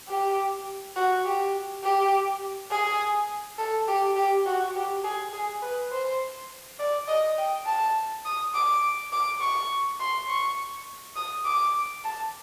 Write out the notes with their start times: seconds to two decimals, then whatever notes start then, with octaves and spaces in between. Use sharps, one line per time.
0.09 G4
0.96 F#4
1.25 G4
1.83 G4
2.71 G#4
3.58 A4
3.88 G4
4.16 G4
4.46 F#4
4.76 G4
5.04 G#4
5.33 G#4
5.62 B4
5.92 C5
6.79 D5
7.08 D#5
7.38 G5
7.66 A5
8.25 D#6
8.54 D6
9.12 D6
9.41 C#6
10.00 C6
10.28 C#6
11.16 D#6
11.45 D6
12.04 A5